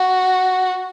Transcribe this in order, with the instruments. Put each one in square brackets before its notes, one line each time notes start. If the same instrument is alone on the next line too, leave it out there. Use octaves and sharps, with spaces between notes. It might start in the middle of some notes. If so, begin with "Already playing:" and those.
Already playing: [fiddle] F#4